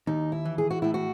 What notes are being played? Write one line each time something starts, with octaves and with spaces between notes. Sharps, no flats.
D#2 D#4
E4
E3
G#4
F#4
A2 E4
F#4